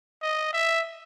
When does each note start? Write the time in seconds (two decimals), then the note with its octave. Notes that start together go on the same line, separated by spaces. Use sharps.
0.22 D#5
0.53 E5